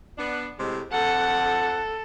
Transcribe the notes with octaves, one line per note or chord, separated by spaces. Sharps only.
B3 D4
A2 C3 G#3
F2 A4 F#5